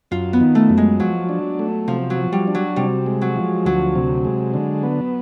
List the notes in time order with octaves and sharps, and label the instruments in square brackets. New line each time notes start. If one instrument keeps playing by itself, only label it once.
[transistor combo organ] F#2 [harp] F4
[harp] B3
[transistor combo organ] D#3
[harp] A3
[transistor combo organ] F#2
[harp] G#3
[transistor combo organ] F3 [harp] F#3
[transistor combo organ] D4
A3
[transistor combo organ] C3 [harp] F3
[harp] F#3
[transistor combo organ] F3
[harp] G3
[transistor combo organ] D4
[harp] F#3
[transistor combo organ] C3 [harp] G3
[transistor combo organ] G#3
[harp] F#3
[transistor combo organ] F3
[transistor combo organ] D2 [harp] F#3
[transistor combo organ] C3
G#3
D3
B3